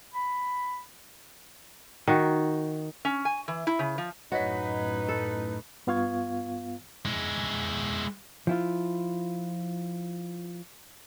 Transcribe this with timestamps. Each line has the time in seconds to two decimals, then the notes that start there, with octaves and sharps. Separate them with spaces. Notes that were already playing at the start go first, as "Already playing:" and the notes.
0.14 B5
2.08 D#3 F#4
3.05 C#4
3.25 G#5
3.48 E3
3.67 E4
3.79 C#3
3.98 F3
4.32 F#2 A2 D#4 F#4 B4 C#5 D#5 B6
5.08 A4
5.87 G2 B3 F4 F5 C#6 G#6
7.05 G#3 E4
8.47 F3 E4 F4